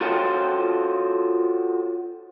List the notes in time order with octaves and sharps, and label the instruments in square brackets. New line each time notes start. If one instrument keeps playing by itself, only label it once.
[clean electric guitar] F4 F#4 A4 C5 C#5 G5